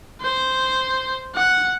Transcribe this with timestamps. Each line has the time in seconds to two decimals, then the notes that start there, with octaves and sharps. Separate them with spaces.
0.22 C5
1.35 F#5